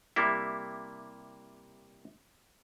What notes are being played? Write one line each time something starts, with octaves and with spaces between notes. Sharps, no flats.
C3 G3 A#3 E4